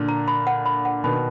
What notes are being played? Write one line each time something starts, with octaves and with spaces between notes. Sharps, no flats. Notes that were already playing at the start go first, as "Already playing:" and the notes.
Already playing: A#2 D3
A#5
B5
F#5
B5
F#5
B2 D#3 B5